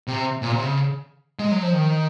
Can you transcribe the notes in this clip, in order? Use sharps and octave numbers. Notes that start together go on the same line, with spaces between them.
C3
A#2
C3
C#3
G#3
F#3
F3
D#3